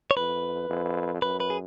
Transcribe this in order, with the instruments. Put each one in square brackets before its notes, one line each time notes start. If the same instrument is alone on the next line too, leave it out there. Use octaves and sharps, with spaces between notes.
[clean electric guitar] C#5
[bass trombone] F2 [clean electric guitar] B4
[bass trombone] F2
[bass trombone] F#2 [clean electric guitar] B4
[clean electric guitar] B4
G#4